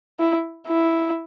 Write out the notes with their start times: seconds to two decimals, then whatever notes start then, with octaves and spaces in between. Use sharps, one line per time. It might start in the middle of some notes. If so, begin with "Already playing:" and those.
0.20 E4
0.67 E4